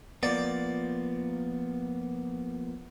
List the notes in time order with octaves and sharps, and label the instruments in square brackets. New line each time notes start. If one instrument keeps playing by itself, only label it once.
[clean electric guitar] F3 A#3 B3 [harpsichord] D5